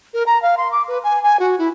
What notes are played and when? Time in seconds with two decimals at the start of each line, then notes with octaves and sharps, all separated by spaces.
0.13 A#4
0.26 A#5
0.42 F5
0.57 C6
0.72 D6
0.88 B4
1.04 G#5
1.23 G#5
1.39 F#4
1.58 E4